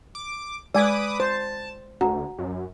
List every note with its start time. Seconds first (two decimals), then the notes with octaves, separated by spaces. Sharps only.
0.15 D6
0.74 G#3 B4 D5 G#5 D6 D#6
1.20 C5 A5
2.01 D2 F#4 F#5 A#5
2.39 F#2